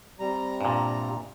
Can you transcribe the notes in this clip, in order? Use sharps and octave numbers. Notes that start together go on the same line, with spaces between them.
C3 G3 A#5
G2 A#2